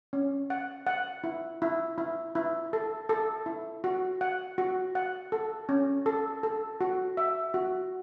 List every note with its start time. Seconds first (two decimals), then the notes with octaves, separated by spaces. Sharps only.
0.13 C#4
0.50 F#5
0.87 F#5
1.24 E4
1.62 E4
1.98 E4
2.35 E4
2.73 A4
3.09 A4
3.46 E4
3.84 F#4
4.21 F#5
4.58 F#4
4.95 F#5
5.32 A4
5.69 C#4
6.06 A4
6.43 A4
6.81 F#4
7.17 E5
7.54 F#4